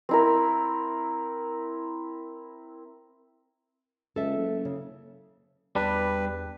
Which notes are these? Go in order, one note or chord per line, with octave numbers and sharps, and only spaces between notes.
C4 E4 A#4
C#2 A4 E5
F#1
C#3
E2 G3 D4 B4